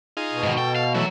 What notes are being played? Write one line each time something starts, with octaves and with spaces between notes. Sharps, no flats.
D#4 F4 G#4
B2
G#2 D#3
A4 G5
F5
E3 F#3 A3